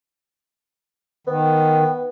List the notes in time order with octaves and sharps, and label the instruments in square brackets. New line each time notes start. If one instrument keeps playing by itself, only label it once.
[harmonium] D#3 [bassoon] B3